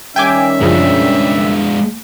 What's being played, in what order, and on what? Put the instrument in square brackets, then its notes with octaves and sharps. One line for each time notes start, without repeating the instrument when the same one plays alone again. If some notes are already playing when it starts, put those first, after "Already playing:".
[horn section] D#3 G3 E5 [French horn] C#4 [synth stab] G5 G#5 D6
[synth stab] F#2 C#3 F3 [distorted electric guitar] G#3 D4